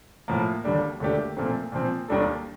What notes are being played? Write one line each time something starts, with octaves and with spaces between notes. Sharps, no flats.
A2 F3 A#3
D#2 D3 G3 D4
D#2 D3 A3 D4 G4
A#2 F3 A3 C4
A#2 F3 C4
D#2 D#3 G3 D4 A4